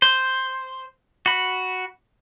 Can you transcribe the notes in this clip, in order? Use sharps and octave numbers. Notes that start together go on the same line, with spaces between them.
C5
F#4 B5